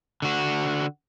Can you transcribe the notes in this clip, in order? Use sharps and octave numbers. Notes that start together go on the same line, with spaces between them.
D3 F#4